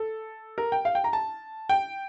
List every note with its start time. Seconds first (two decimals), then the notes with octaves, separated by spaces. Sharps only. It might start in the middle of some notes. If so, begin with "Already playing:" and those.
Already playing: A4
0.58 A#4
0.72 G5
0.85 F5
0.95 G5
1.04 A#5
1.13 A5
1.69 G5